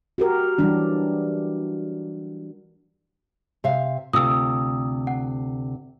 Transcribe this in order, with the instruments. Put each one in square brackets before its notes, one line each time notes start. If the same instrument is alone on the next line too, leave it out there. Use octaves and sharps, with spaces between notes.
[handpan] F#4 G4 A#4
E3 F#3 G3 D4
[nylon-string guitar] C3 E5 F5
[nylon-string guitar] D2 C3 F4 [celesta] D#6 E6
[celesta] F#5